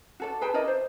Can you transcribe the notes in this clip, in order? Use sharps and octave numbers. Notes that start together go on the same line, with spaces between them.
F#4 A4 D5
G#4 B4 G5 A5
E4 A#4 D5 D#5
C5